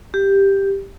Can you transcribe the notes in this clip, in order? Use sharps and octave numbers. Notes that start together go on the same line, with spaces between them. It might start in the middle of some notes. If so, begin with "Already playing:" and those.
G4